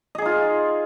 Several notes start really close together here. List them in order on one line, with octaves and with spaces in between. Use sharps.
D#5 G#4 D#4 F4